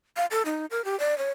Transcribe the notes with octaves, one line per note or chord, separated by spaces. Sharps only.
F5
A4
D#4
A#4
G4
D5
C#5